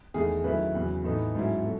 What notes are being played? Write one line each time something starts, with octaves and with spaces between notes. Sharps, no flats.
E2 D#3 A3 G#4
F#2 D#3 A3 E4 B4
E2 C#3 F#3
A2 E3 B3 D#4 A4
G#2 F#3 C#4 E4
B2 F#3 A4